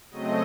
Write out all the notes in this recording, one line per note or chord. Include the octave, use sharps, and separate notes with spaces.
C#3 F#3 A3 C4 D#5